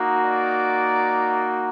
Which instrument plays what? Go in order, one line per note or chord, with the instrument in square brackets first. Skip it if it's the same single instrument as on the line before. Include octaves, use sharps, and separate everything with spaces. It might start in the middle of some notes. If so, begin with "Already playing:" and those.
Already playing: [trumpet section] A#3 D#4 F#4
D5